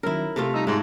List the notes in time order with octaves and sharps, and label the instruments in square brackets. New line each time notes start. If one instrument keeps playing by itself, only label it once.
[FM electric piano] D#3 F#3 C#4 [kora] E4 A#4
[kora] C3 A3 F4 [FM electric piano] A4
[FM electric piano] G3 E6 [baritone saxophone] D#4
[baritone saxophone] G#2 [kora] D4 C#5